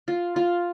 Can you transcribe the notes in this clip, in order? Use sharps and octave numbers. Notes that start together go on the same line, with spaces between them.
F4
F4